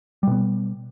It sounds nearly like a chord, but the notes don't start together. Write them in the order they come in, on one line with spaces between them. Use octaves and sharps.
G3 B2 B3